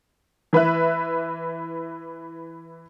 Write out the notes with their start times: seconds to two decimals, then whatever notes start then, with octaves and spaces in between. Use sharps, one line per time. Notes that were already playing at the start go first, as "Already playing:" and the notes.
0.53 E3 B4 E5 F#6